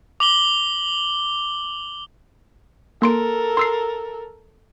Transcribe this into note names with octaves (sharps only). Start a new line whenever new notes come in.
D6 F#7 G7
A#3 A4 A#4 C6 D7
C6 E6 C7